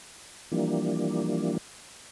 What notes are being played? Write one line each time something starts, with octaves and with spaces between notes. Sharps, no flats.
E3 F3 G3 A#3 D4